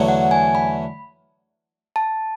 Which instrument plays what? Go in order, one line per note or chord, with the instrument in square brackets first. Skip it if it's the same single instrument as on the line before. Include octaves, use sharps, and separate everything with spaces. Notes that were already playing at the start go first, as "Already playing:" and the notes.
Already playing: [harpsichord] E2 D3 F#3 A3
[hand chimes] F#5
G#5
B5
A5